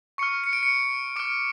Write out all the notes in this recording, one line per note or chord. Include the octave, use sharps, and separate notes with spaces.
C#6 F6 C#7
C#7
D7
C#7
D6 F6 D7